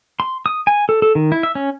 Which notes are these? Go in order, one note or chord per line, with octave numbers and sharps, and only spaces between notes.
C6
D#6
G#5
A4
A4
D#3
E4
E5
C#4